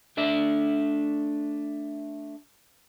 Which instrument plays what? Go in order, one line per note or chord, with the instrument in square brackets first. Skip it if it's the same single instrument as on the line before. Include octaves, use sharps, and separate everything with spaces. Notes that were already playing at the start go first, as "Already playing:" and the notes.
[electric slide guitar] A3 D4 E5